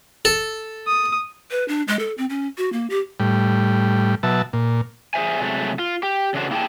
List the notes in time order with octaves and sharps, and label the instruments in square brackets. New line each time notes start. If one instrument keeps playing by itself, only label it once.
[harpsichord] A4
[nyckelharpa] D#6
[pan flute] B4
D4
G#3
A4
C4
C#4
F#4
A#3
G4
[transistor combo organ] A2 G3
B2 F#3 E5 A5
A#2
[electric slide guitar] G#4 B4 C5 E5 G#5
C3 F#3 G#3 A3
F4
G4
C#3 E3 D4 F#4 A4 C5
A#3 E4 G4 G#4 G5 A5